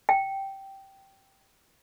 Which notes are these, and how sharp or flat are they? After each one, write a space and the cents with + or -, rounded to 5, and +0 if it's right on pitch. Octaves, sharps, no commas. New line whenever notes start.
G5 -10